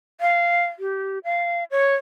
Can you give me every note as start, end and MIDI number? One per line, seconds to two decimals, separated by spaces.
0.21 0.65 77
0.79 1.19 67
1.24 1.64 77
1.71 1.95 73